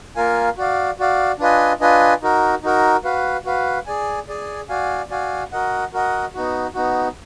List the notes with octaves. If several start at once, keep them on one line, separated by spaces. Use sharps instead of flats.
A#3 F4 A#4 F5 G#5
F#4 D5 F5
F#4 D5 F5
D4 F4 B4 D#5 G#5
D4 F4 B4 D#5 G#5
D#4 F#4 A#4
D#4 F#4 A#4
F#4 B4 F5
F#4 B4 F5
G#4 D5 G#5
G#4 D5 G#5
F#4 D5 F5 G#5
F#4 D5 F5 G#5
F#4 A#4 D#5 F#5
F#4 A#4 D#5 F#5
B3 D#4 F#4
B3 D#4 F#4